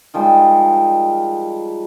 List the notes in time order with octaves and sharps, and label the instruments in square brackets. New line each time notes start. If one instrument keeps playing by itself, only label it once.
[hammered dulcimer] D#3 F3 G3 G#3